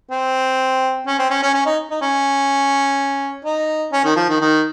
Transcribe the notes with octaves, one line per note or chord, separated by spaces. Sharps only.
C4
C#4
C4
C#4
C#4
C#4
D#4
D#4
C#4
D#4
C#4
D#3
F3
D#3
D#3